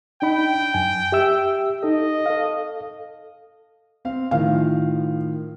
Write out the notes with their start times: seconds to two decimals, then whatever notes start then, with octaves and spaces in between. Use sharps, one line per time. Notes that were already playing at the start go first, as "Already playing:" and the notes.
0.22 D4 D#4 G5 B5
0.74 F#2 G#5
1.12 G4 E5 E6
1.83 D#4 A4 D#5
2.26 A4 F5
4.05 C4 F5
4.31 A2 D#3 F3 F5